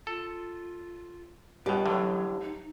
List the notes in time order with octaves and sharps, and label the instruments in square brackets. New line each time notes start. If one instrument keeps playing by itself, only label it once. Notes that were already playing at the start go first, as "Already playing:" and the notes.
[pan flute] F4 [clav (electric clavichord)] A4
[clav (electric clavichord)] C#2 B2 [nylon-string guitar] G3 G4 [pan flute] B4
[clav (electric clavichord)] A1 A2 D3 [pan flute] F#3
[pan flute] D#4